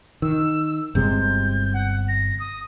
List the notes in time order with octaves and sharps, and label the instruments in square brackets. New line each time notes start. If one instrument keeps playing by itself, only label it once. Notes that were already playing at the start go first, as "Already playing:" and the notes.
[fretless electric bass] D#3 [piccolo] E6
[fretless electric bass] G1 C3 G#3 [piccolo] G6
[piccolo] F#5
A#6
D#6